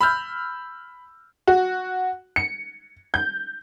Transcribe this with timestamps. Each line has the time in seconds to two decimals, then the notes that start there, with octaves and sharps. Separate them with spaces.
0.01 B5 E6 F6 G6
1.47 F#4
2.36 C#7
3.14 G6